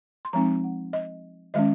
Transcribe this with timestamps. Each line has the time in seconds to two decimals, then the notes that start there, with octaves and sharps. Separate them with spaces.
0.25 C6
0.33 F3 G#3 C4 D#4 A#5
0.64 F#5
0.93 D#5
1.54 D#3 G#3 C#4 D#5